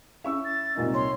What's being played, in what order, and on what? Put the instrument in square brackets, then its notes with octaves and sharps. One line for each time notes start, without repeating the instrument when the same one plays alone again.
[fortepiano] C#4 E4 [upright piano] E5 C#6 E6
[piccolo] A6
[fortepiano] C2 A#2 D#4
[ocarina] C#5 [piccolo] C6